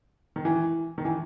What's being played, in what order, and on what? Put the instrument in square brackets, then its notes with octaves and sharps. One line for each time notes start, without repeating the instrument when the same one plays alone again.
[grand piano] D#3
E3
D#3
E3